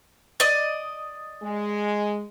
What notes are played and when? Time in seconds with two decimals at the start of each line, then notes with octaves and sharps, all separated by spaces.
0.40 D5 D#5
1.42 G#3